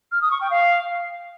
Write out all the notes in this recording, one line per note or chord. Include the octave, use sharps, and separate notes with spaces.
F6
D#6
C#6
G5
F5